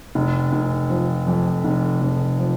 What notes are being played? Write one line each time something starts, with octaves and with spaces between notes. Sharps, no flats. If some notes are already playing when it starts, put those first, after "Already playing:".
F1
F1
F3
F2
F1
F1
F3